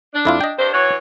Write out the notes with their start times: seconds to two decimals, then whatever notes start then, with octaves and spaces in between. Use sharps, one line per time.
0.14 D4
0.25 F2 E4 F4
0.41 D#5 G5
0.57 G2 C5
0.73 E3 F#4 C#5